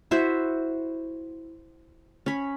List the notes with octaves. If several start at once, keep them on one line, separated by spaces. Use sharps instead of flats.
E4 F#4 C5 E5
C#4 B5